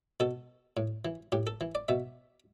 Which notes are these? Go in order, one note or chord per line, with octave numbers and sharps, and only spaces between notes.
B2 A4
A2
E3
A2 G4
A4
E3
D5
B2 E5